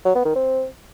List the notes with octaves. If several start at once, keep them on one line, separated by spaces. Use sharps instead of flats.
F#3
B3
D#3
C4